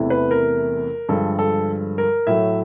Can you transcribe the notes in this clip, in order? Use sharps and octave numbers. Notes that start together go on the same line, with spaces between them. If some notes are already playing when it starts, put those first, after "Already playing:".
Already playing: E2 C3 E3 A3
B4
A#4
G2 D3 F3 G#3 A4
A4
A#4
A2 F#3 A3 E5